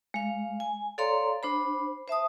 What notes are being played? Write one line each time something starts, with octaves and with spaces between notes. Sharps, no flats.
G#3 F5
G#5
A4 C#5 D5 F5 A#5 C6
D4 C5 B5
C5 E5 A5 D#6